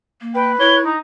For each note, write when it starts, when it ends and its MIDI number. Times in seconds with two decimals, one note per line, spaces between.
0.21 0.55 58
0.34 0.79 71
0.34 0.52 79
0.60 0.91 64
0.60 0.79 73
0.60 0.75 103
0.86 0.97 63
0.86 0.99 82